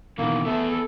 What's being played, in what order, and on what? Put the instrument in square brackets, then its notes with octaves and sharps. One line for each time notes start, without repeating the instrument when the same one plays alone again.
[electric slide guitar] B2 D#3 E3 [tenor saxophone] A#3
[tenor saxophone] A3 [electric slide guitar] B3 G4 G#4
[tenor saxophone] A4